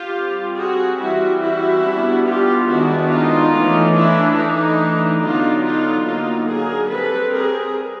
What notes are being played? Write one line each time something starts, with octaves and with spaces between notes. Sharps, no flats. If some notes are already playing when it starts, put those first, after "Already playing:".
Already playing: F4 G4
G3 C4
F#4 G#4
E3 G3 C4 E4 F#4
E4 F#4
G3 B3 D4
F4 G4
D#3 G#3 B3 D4 E4 F#4
D#4 F4
E3 A3 C#4
D4 E4
E3 A3 D4 D#4
D3 F#3 B3 D4 D#4 F4
D#4 F4
D3 F#3 A#3 D#4 F4
G#4 A#4
G3 C4 A4 B4
G#4 A#4